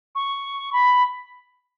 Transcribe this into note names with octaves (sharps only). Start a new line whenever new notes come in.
C#6
B5